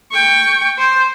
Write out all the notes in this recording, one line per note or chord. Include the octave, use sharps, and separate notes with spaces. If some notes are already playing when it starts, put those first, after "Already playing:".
G5 C#6
C5